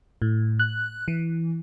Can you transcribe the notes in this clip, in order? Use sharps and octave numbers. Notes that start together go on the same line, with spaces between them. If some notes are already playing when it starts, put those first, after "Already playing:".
A2
F#6
E3